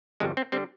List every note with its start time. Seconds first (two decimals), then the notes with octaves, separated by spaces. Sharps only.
0.20 G1 F2 C3 G3 G#3
0.37 C4
0.52 D3 G3 C4